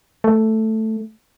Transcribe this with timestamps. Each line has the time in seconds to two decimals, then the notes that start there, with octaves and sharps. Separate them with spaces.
0.24 A3